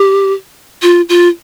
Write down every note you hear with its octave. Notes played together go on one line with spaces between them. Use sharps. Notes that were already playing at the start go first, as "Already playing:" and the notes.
Already playing: G4
F4
F4